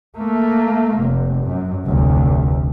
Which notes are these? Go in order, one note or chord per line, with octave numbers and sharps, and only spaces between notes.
A3 A#3
F1
F#2
F1 D2